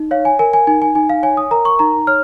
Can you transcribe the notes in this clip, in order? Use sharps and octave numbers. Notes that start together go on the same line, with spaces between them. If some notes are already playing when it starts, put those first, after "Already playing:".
Already playing: D#4
C#5 F5
G#5
A#4 G#5
G#5
D#4 G#5
G#5
D#4 G#5
F5
C#5 G#5
D#6
A#4 A#5
C#6
D#4 A#5
C#5 F6